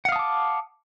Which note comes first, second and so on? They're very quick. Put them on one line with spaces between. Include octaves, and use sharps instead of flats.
F#5 F5 D#6 A5 D6